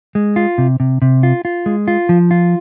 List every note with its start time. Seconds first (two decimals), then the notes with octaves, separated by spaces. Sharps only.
0.15 G#3
0.36 F4
0.58 C3
0.80 C3
1.02 C3
1.23 F4
1.45 F4
1.66 G#3
1.88 F4
2.09 F3
2.31 F4